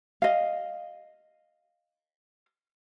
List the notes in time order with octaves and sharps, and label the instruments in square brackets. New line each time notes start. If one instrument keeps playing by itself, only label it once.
[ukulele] D#5 F5